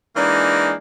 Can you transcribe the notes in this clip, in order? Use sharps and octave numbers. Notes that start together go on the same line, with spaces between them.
E3 G#3 A#3 D4 D#4